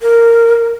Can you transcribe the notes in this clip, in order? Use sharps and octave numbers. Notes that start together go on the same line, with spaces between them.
A#4